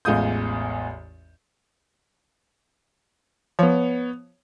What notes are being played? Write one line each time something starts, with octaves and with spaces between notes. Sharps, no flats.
A1 E2 G#3 F4 D#6 G6
F3 B3 C#5